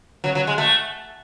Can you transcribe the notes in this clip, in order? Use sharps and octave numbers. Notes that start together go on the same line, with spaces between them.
F#3
F#3
G#3
A3